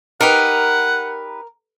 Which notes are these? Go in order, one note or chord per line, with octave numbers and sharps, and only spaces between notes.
D#4 G4 A#4 B4 F#5